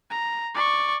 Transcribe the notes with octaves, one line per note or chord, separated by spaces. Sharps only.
A#5
D5 C#6